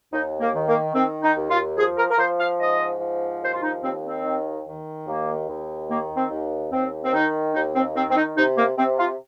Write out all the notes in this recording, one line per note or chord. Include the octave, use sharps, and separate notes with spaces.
D#2 D#4
A#3
D#3
A#3
D#3 C4
D#4
D#2
F4
F3 G#4
A#4
A#4
F3 C5
F5
G#2 D#5
F3
D#2 C5
F4
D#4
D#2 C4
C4
D#3
D#3
D#2 A#3
D#2
D#3 A#3
C4
D#2
D#2 C4
C4
D#3 D#4
D#2 D#4
C4
D#3 C4
C4
D#4
C3 D#4
A#3
C3 C4
F4